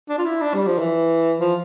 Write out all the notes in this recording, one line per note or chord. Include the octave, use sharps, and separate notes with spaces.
D4
F4
E4
D4
G3
F3
E3
F3